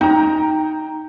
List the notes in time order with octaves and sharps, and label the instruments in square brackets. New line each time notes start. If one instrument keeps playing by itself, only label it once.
[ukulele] D#4 [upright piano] G5 A#5